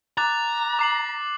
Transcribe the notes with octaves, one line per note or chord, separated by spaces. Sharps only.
A#5 D6 F#6 A6
D6 C7 F#7